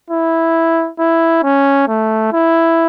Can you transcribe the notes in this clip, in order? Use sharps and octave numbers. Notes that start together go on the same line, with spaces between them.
E4
E4
C#4
A3
E4